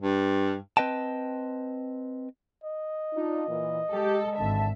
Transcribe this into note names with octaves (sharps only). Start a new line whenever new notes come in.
G2
C4 B4 D#5 G5 A5
D#5
D4 D#4 F4
A#2 E3
G#3 G4 A4
G#1 D3 E5 A5